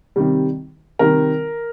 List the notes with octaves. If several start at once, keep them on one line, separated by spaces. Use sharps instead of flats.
C3 D#3 G3
C3 D#3 G3 A#4